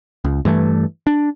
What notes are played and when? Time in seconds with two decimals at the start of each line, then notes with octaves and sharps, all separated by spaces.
0.24 C#2
0.45 G2 E3 A3
1.07 D4